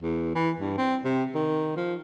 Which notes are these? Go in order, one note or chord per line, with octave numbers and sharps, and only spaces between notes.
E2
E3
G2
C4
C3
D#3
F3